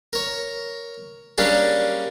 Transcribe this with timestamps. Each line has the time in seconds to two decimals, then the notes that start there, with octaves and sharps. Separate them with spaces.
0.13 A#4 C#5
1.38 G3 A#3 C#4 D4 G#4